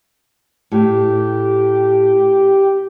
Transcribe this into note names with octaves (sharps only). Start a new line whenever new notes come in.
A2 G4